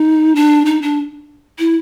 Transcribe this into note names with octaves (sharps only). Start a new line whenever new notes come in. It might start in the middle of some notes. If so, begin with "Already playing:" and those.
Already playing: D#4
D4
D#4
D4
E4